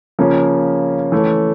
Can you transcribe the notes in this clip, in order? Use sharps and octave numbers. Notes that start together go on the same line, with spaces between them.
C#3 F3 A#3 C#4
E3 A3 C#4